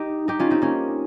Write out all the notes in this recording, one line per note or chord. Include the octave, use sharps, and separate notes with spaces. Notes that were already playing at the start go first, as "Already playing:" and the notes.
Already playing: D#4 G4
D#4 G4
C#4 F4
C4 D#4
A#3 C#4